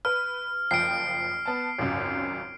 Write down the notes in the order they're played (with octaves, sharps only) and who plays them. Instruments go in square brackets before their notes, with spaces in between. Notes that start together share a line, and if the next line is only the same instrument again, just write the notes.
[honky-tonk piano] B4 [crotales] F6
[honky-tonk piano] F#1 F3 G5 [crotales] C7 D7
[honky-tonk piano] B3 A5
G#1 C#2 F#2